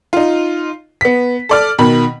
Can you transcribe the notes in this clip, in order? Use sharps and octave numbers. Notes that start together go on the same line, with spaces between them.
D#4 F4
B3 B6
A4 D5 F6
B2 D#3 B5